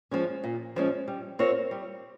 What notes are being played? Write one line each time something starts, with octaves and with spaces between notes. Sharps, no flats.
F3 G#3 C#4
A#2
F3 G#3 C#4
G3
C4 F4 A#4 C#5
G3